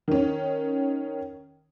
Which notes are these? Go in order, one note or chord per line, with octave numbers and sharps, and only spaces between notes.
D#3 C#4